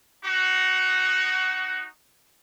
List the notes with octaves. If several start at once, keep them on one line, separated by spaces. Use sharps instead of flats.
D#4 F#4